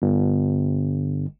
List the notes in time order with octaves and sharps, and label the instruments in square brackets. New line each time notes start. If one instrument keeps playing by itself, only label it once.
[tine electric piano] G1